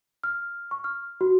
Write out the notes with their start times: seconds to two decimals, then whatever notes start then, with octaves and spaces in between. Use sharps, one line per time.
0.24 F6
0.71 C#6
0.84 F6
1.21 F#4